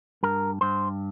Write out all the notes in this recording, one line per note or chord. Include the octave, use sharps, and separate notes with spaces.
G2 A#4
G2 C5